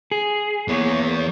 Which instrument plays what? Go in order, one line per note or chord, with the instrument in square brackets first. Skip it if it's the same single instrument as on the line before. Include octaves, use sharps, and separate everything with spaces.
[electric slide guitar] G#4
[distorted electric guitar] E2 B3 [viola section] A#3 C#5